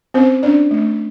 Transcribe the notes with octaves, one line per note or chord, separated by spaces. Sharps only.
C4 C#4 C5
C#4 D4 D5
A3